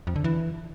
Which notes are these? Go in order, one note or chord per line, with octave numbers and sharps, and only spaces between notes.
F2
D3
E3